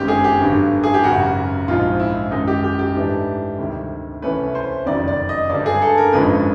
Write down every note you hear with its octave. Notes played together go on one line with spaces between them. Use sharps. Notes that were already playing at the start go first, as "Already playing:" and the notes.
Already playing: G1 F#2 D#3 G#3 C4 G4
G#4
G4
G#1 G2 D3 F#3
G#4
G4
G#1 F#2 C#3 F#3 F#4
A#1 G#2 F3 G#3 F4
E4
F#2 D#3 G#3 D#4
G4
G4
G4
G#2 E3 A3 D4
D2 C3 D#3 G3
C2 C3 E3 A3 C#4 B4
C5
F#1 F2 C3 D#3 F#3 D5
D5
D#5
G2 D3 G3 D5
G#4
A4
A#4
G#1 F#2 D3 F3 G#3 B4